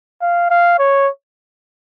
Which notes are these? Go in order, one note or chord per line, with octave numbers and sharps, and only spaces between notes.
F5
F5
C#5